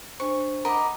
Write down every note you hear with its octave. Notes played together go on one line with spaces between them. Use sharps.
D4 C5 C#6
A#4 D#5 F#5 B5 D6